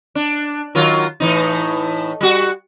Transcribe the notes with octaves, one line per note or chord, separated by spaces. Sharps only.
D4
D#3 F#3 F4
A2 E3 D#4
G3 F#4